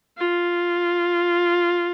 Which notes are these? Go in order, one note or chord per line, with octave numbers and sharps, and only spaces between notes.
F4